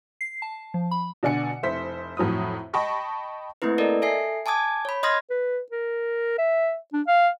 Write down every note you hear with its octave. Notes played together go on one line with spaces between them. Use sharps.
C7
A5
F3
B5
B2 D3 D5 F#5 G#5 C#7
F1 E4 C5 B6
F2 A2 F#3 B5 D#6
D#5 G5 A5 B5 C#6 A#6
A3 A#3 C4 E4 B4
A4 A#4 D5 D#5
A4 E5 G#5 C7
G#5 A5 D6 D#6 G#6
C#5 B5
D#5 C6 D#6 F6 G#6 A#6
B4
A#4
E5
D4
F5